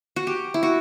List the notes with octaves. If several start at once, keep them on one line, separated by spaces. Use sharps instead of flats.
F#4
G4
E4
F#4